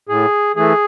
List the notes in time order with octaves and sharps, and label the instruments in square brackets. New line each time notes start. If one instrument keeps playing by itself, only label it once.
[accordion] A2 G#4
E3 A3 G#4